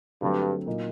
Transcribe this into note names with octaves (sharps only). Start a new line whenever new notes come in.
G2 D3 F#3 A3 C4
A#2 F#3 A#3 D#4